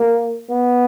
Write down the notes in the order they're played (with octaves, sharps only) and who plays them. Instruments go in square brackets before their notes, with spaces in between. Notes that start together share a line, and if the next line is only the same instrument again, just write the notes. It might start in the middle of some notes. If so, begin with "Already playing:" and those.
Already playing: [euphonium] A#3
B3